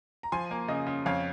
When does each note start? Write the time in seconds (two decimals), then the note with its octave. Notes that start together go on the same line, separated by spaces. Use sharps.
0.23 A#5
0.32 F3 G#5 C6
0.51 A#3
0.68 C#3 D#5
0.87 C#3
1.06 F2 C#5 F5